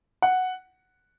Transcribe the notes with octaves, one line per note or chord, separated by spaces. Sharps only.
F#5